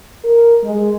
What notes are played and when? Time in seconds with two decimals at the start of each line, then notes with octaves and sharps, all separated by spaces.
0.25 A#4
0.63 G#3